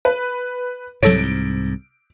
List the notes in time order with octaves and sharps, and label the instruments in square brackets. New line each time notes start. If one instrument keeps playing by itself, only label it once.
[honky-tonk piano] B4
[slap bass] C2 G#2 [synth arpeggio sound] F#3 A4 C#5 [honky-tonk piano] D7